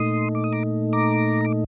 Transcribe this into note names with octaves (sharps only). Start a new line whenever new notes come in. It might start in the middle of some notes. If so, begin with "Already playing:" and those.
Already playing: A#2 A3 D#4 C6 D#6
D6
D#6
A#5 D6
A#5 D6
D6